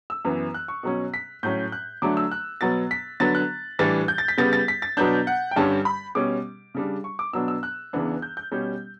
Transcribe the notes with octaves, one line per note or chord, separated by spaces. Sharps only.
E6
F#2 E3 B3
F#6
C#6
B2 F#3 C#4
B6
A2 F#3 C#4 G6
F#6
D3 F#3 A3 D4 D6
E6
F#6
B2 F#3 B3 A6
B6
D3 F#3 B3 A6
F#6
A2 E3 G3 D4 A6
G6
A6
B6
C#3 G3 B3 A6
A6
B6
A6
B2 F#3 B3 D4 G6
F#5
G5
G2 D3 G3 C#4 A5
B5
B2 G3 C#4 D6
C#3 G3 D4
C#6
D6
B2 F#3 B3 D4 E6
E6
F#6
E2 C#3 E3 B3 D4
G6
G6
B2 G3 C#4